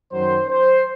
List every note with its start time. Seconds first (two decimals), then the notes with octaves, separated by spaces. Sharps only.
0.11 F#2 D#3 F#3 C5
0.49 C5